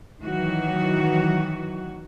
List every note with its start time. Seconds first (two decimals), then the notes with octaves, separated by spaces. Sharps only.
0.20 D#3 E3 F#3 F#4